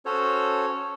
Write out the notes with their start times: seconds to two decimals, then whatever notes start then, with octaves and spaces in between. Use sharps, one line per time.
0.05 C#4 F#4 A4 C5 C#5